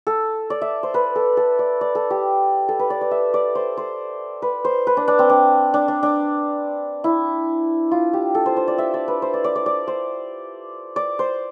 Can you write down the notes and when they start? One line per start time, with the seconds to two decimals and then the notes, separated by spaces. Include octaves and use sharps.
0.07 A4
0.50 D5
0.62 E5
0.83 C5
0.94 B4
1.15 A4
1.37 A4
1.59 D5
1.81 D5
1.95 A4
2.10 G4
2.68 A4
2.79 B4
2.90 D5
3.01 D5
3.11 E5
3.34 D5
3.55 C5
3.77 C5
4.42 B4
4.65 C5
4.87 B4
4.97 D4
5.08 D4
5.19 C4
5.29 D4
5.74 D4
5.88 D4
6.03 D4
7.04 E4
7.91 F4
8.13 G4
8.35 A4
8.46 C5
8.56 C5
8.68 D5
8.78 E5
8.94 D5
9.08 B4
9.22 C5
9.34 D5
9.44 D5
9.56 D5
9.66 D5
9.88 C5
10.96 D5
11.19 C5